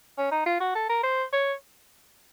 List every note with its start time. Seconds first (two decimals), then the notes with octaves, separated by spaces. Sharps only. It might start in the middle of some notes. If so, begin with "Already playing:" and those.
0.18 C#4
0.32 D#4
0.46 F4
0.60 F#4
0.75 A4
0.89 A#4
1.03 C5
1.33 C#5